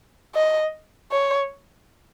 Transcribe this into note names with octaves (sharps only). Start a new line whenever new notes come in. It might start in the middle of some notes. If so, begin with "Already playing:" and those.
D#5
C#5